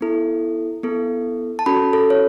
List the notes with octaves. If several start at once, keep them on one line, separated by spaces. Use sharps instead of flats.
B3 E4 A4
B3 E4 A4
A5
C#4 F#4 A4 B5
A4
C#5